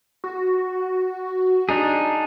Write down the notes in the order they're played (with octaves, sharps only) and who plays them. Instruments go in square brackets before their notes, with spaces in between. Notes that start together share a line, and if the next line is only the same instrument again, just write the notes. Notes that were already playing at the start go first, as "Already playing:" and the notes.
[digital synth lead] F#4
[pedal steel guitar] D4 D#4 G#4